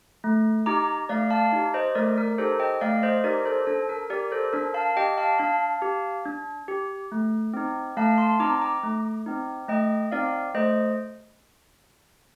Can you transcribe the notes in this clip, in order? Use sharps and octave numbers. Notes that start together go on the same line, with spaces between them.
A3
D#4 G4 A#5 D6
A3 D5 F5
F5 A5
D#4 G4
C5 D#5
A3 A#4 D5
A#4
D#4 G4 A4 C5
D#5 G5
A3 D5 F5
C5 D#5
D#4 G4 A#4 D5
A4 C5
D4 A4
A#4
G4 A#4 D5
A4 C5
D4 A#4
F5 A5
G4 D#5 G5
F5 A5
D4 F5 A5
G4
D4
G4
A3
C4 D#4
A3 F5 A5
A5 C6
C4 D#4 A#5 D6
A#5 D6
A3
C4 D#4
A3 D#5 G5
C4 D#4 D5 F5
A3 C5 D#5